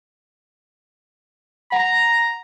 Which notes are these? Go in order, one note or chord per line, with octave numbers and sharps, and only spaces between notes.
F#5 A#5